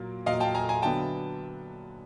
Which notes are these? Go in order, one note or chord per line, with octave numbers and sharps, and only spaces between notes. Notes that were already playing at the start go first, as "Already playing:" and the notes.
Already playing: A#2 F#3 A#3
A#2 F#3 A#3 D#5 F5
G5 A5
G#5 A#5
G#5 A#5
D3 F#3 B3 D4 G5 A5